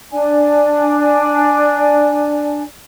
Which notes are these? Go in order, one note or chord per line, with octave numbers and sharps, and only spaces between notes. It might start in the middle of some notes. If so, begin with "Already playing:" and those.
D4 D5 G#5